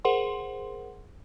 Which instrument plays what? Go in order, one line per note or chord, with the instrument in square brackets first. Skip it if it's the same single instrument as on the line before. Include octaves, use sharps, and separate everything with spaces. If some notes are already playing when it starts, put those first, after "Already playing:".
[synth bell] G#4 A#4 C5 F#5 C6